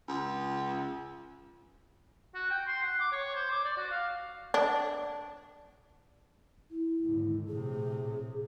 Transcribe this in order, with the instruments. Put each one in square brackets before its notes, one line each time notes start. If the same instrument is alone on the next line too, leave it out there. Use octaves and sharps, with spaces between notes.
[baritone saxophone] C#2
[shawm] F#4
G5
C6
F#5
D6
C#5
C5
D6
D5
F#4
F5
[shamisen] D4
[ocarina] E4
[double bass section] D#2 G#2 D3
[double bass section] A#1 A2 C3 [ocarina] G#4